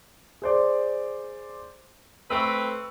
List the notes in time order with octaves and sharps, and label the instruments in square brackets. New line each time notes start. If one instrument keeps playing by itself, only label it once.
[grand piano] G#4 C5 D5
[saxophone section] A3 C4 B4 [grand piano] C#6 E6